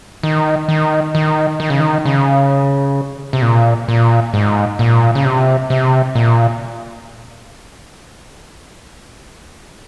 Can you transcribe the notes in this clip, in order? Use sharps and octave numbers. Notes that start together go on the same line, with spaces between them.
D#3
D#3
D#3
D#3
C#3
D#3
C#3
C3
A#2
A#2
G#2
A#2
C#3
C3
C3
A#2